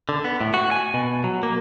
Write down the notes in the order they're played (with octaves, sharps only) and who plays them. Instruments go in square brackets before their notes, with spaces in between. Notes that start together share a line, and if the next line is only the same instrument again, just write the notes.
[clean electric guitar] D3
B3
A2
F#4
G#5
B2
F#3
A#3